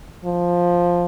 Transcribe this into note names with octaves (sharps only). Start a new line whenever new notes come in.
F3